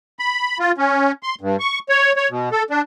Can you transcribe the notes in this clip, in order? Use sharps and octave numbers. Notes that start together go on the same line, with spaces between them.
B5
F4
C#4
C6
G2
C#6
C#5
C#5
B2
A4
D4